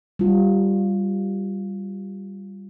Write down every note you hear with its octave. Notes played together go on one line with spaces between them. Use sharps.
G3 F4